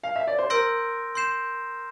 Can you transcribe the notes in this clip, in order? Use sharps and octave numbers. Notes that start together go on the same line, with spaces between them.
F5
E5
D5
C5
A#4 C6 E6 G6 A#6 D7
C6 G6 C7 E7